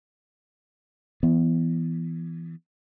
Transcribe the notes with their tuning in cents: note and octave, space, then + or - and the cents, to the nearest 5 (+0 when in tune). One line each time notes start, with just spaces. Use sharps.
E3 +15 B3 +0